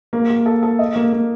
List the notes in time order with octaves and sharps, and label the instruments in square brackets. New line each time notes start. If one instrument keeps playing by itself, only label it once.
[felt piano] A#3
A#3
A4
A4
D#5
A#3
A#3